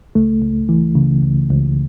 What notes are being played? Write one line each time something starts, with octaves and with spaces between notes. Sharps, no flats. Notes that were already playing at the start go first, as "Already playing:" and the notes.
C#2 A3
C#2
E3
C#3
C#2
C#2